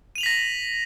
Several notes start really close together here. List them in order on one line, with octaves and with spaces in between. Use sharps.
D#7 F7 F#7 B6 A#6